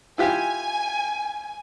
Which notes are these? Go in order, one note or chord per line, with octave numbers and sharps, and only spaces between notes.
E4 F4 G4 G#5